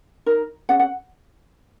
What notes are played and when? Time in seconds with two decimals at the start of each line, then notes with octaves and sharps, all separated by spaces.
0.26 D#4 A#4
0.69 C#4 G#4 F#5
0.79 F#5